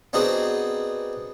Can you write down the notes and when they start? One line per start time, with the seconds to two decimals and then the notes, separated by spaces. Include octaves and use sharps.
0.13 B3 C4 D4 D#4 F#4 G#4